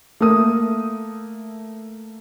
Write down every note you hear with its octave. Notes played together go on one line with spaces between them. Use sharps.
A3 A#3 E5 D#6